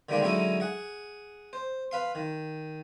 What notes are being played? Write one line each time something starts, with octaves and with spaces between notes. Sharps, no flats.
D3 D#3 G3 G#3 A#3 D4
D3 F#3 G#3 C#4 D#4 E4
G#4 F#5
C5
B4 F5 C6
D#3